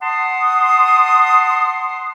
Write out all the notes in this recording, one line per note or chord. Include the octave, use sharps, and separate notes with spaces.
F#5 A5 C6 D#6